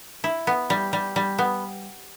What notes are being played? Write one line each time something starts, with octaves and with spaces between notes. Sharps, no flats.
E4
B3
G3
G3
G3
B3